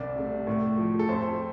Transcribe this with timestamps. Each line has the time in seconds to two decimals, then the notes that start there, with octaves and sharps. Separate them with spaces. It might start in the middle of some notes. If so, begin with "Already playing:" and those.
Already playing: C2 D5
0.16 C3 A3
0.47 A2
0.78 F3 A3
0.99 A4
1.09 F2 C5